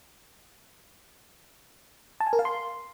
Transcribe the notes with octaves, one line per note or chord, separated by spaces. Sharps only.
A5
G#5
A#4
F5
C6